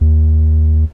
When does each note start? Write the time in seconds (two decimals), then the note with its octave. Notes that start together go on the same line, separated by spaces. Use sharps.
0.01 D#2